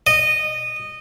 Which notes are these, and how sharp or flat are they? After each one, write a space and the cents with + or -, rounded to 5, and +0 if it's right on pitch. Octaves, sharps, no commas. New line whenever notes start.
D#5 -15